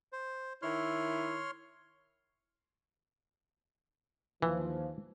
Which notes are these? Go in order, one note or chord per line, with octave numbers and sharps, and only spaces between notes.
C5
D#3 E4 C#5 C6 F6
D#2 E3 F3